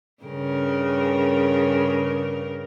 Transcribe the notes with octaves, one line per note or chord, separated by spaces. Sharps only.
G2 C#3 A#4